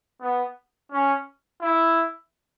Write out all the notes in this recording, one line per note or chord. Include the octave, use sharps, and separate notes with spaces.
B3
C#4
E4